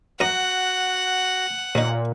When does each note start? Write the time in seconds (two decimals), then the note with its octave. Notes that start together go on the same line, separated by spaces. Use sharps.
0.20 F#2 F#4 F#5 A#5 D#6
1.75 D#2 A#2 D#4